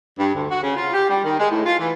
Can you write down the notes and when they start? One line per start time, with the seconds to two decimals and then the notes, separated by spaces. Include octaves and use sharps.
0.19 G2
0.34 D2
0.50 F#4
0.63 C#3
0.77 F4
0.94 G4
1.09 G3
1.24 D#3
1.38 G#3
1.51 A2
1.65 F4
1.79 E3